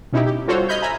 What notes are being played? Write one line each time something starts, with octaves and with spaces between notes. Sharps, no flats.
B2 C#4 D#4 E4 G4
G4
G3 F4 F#4 A4 C5 C#5
D#5 B5 F6 G6 G#6
E5 G#5 A#5 B5